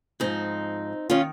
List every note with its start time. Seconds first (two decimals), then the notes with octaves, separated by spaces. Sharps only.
0.20 G#2 F3 C4 D#4
1.10 D#3 C#4 F4